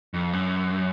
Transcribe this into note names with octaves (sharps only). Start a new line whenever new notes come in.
F2
F#2